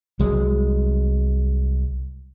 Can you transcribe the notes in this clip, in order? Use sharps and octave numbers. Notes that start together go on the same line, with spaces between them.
C2 F#3 G#3